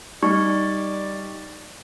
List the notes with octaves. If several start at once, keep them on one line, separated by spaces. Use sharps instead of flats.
G3 D#4 D5 C#6